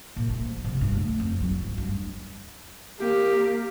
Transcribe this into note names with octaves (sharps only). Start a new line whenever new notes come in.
A#2
A3
F3
C3
G2
A3
F2
F#3
G#1
G2
A#3 G4